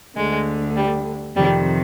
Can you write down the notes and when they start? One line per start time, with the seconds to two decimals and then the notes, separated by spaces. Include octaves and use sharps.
0.16 D2 D3 G#3
0.77 G3
1.36 F2 C3 D#3 G3